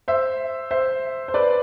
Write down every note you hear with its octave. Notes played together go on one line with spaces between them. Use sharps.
C5 E5
C5 E5
C5
B4 D5